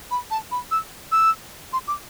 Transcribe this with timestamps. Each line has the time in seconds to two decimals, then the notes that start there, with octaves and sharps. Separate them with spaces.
0.11 B5
0.31 A5
0.51 B5
0.71 E6
1.12 E6
1.73 C6
1.88 D6